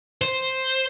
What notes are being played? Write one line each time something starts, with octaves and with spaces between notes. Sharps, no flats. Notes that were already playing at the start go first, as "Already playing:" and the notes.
C5